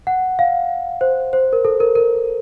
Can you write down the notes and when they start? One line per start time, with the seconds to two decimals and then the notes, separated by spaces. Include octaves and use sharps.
0.07 F#5
0.39 F5
1.01 C5
1.33 C5
1.53 A#4
1.65 A4
1.80 A#4
1.95 A#4